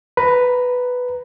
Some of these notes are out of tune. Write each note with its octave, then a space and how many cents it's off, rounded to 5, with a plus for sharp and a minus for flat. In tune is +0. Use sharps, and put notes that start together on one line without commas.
B4 +5 A#5 +0